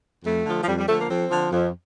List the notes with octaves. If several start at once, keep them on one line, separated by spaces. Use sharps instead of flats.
F2 A3
D3 F3
F3
F2 G3
G3
D3 F3 A3
A#3
F2 C4
D3 F3
F2